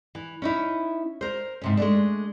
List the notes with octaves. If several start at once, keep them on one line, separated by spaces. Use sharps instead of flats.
E3
C#4 D#4 E4
A#4 C5
G#2 C3 C#4
G#3 A3 D4